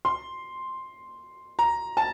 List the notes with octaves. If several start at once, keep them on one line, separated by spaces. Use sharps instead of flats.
C6
A#5
A5